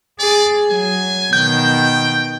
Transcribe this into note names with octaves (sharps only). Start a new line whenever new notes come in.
G#4 D5
F#3 G#5
B2 D#3 G5 G6